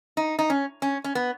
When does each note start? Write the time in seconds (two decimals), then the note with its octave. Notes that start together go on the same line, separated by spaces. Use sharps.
0.17 D#4
0.39 D#4
0.50 C#4
0.82 C#4
1.04 C#4
1.15 B3